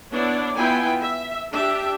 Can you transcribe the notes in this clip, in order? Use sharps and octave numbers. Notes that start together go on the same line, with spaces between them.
B3 D4 E4 C#5 D5
B3 E4 F4 G5 G#5
E5
D4 G4 E5